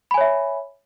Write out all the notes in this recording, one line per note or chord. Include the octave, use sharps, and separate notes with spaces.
C#5 E5 G#5 B5